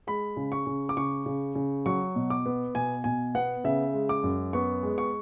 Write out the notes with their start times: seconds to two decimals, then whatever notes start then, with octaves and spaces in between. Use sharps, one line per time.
0.07 G#3 B5
0.37 C#3
0.52 C#6
0.66 C#3
0.89 D6
0.97 C#3 C#6
1.26 C#3
1.55 C#3
1.86 F#3 C#6
2.16 B2
2.30 D6
2.46 B3
2.75 B2 G#5
3.04 B2 G#5
3.35 B3 F#5
3.64 C#3 E5
3.94 G#3
4.09 D6
4.24 F#2
4.53 B3 C#6
4.83 G#3
4.98 C#6